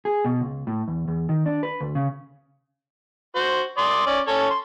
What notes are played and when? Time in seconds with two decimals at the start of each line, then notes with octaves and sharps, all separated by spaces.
0.05 G#4
0.25 B2
0.41 C#2
0.67 A2
0.88 E2
1.08 E2
1.29 D#3
1.46 D4
1.63 B4
1.80 D2
1.95 C#3
3.35 F#4 C5
3.78 D5 C6 D#6
4.07 C#4 D5
4.27 C#4 A4 C#5
4.50 C6